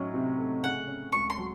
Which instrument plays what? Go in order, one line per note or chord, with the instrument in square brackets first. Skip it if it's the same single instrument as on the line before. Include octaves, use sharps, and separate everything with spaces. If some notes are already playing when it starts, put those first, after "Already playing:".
Already playing: [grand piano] A2 F#3 C#4 D#4
C3
A3
[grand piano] C#3 [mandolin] F#5
[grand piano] C#4
[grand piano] C#2 [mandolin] C#6
[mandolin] C6
[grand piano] F#3